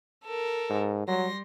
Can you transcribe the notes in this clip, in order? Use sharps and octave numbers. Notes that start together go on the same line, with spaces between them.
A4 A#4
G#2
F#3 G3 C6 A#6